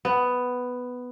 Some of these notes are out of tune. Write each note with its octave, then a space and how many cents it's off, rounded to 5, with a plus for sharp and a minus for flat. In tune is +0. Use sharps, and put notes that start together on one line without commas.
B3 +5